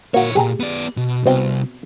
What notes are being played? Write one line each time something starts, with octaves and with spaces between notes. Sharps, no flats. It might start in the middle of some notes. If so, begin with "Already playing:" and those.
A#2 A#3 F#4 C#5
F#2 A#2 G4 G#4 A#5
B3 D5
B2
C2 B2 C4 G5